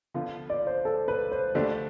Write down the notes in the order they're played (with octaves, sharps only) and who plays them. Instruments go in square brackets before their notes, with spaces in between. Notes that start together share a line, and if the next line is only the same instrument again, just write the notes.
[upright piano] D3 F3 B3 F4
[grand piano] D5
C5
A4
B4
C5
[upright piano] D3 F3 A3 D4 G4 [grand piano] D5